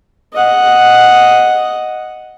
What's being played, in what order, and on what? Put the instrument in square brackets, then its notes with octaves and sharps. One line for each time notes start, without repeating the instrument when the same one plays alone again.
[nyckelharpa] D#5 F#5